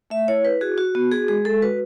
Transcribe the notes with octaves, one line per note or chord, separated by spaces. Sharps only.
A3 E5
E4 C#5
E4 B4
F#4 G#4
F#4
B3 F#4
F#4 G#4
G#3 G#4
G#3 A4
F#4 B4